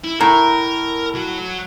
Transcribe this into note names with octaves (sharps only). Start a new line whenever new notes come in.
E4
A2 A#4 A#5
F#3